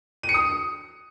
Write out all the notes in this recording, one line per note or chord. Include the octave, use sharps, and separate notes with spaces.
D#7
C#7
D#6